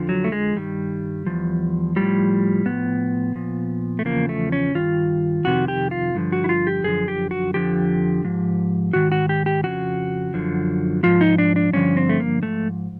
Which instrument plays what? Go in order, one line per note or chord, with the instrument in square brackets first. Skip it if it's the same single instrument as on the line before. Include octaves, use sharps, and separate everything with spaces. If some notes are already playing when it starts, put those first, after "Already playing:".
Already playing: [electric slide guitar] F2 D3 F3
F#3
A3
G#3
G2 D#3 G3
E2 C3 F3
A2 F3 G3
A2 F3 B3
A#2 F3
A3
E2 C#3 F3 A#3
A3
C#4
G2 D#3 F4
F2 C3 D#3 F#4
G4
F4
G2 D3 F3
F#4
E4
F4
G4
F#2 D3 F3 G#4
G4
F#4
F2 D3 F3 G4
G#2 F3
G#2 D#3 F#4
F#4
G4
G4
F2 C#3 F3 F#4
F#2 D3 F3
G#2 F3 F4
D#4
D4
D4
G2 D3 F3 C#4
C4
A3
A#3
G#2 F3 A3